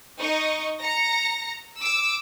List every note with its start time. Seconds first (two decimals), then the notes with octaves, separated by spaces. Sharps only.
0.20 D#4 D#5 C#6
0.82 A#5 A#6 C#7
1.80 D6 E6